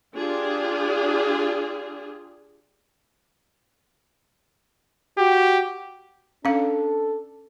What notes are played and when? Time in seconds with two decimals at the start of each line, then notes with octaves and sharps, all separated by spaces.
0.15 D4 F4 G4 G#4
5.18 F#4 G4
6.45 C#4 D4 A4 F5